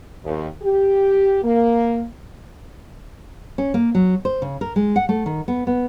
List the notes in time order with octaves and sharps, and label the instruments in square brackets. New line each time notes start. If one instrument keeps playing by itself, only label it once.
[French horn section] D#2
G4
A#3
[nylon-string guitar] C#4
A#3
F#3
C5
C#3
A#4
G#3
F#5
A3
D#3
B3
B3